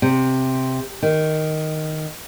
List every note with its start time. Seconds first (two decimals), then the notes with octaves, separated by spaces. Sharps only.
0.02 C3
1.02 D#3